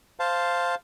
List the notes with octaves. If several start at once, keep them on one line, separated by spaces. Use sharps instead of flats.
C5 F5 A5